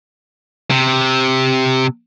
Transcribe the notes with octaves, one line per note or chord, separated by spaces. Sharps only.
C3